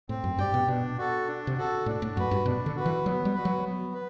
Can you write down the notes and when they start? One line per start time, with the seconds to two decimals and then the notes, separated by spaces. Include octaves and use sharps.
0.09 A2 C4
0.24 F#2
0.38 G2 G4 D5 G5
0.54 B2
0.68 B2 D4
0.98 F#4 A4
1.28 D4
1.47 C3
1.57 F#4 A4
1.86 A2 D4
2.02 A2
2.16 F#2 F#4 B4
2.31 G2
2.46 B2 D4
2.66 D3
2.76 F#4 B4
2.86 E3
3.06 F#3 B3
3.25 G3
3.34 F#4 B4
3.45 F#3
3.64 B3
3.94 B4